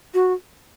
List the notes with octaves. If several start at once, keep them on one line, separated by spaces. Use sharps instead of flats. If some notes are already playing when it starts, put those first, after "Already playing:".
F#4